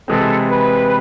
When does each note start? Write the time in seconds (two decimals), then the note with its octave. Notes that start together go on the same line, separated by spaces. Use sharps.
0.08 C3 E3 G#3 C4 A4
0.49 B4